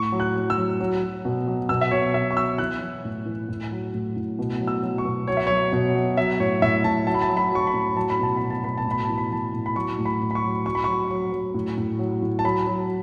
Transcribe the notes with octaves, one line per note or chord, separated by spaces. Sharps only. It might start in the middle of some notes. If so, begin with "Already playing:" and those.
Already playing: A2 C#6
F#3
F#6
F#3
E6
F#3
F#3
F#3
B2
F#3
B2 E6
E5
B2 C#5
B2 E5
C#6
F#3 E6
E3 F#6
E3
A2
E3
A2
F#3
A2
A2
B2
F#3
E6
F#3
C#6
B2
F#3 C#5
E5
F#3 C#5
B2 C#5
F#3
F#3 E5
A2 C#5
A2 E5
A2 A5
F#3 A5
B5
A5
F#3
B5
F#3 C#6
B5
A2
F#3 A5
B5
B2 A5
B2 B5
A5
B2 B5
A5
A2
B5
E3 A5
B5
E3 A5
A2
B5
F#3 C#6
A2
B5
A2
B5
C#6
F#3
F#3 C#6
B5
F#3 C#6
F#3
F#3
A2
A2
F#3
A2
A5
F#3 B5
F#3